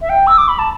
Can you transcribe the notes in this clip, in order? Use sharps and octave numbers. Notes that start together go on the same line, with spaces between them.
E5
G5
E6
D6
B5
A5